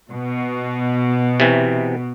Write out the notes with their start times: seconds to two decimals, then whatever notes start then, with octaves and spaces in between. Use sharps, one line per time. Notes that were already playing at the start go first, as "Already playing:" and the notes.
0.11 B2
1.40 C3 E3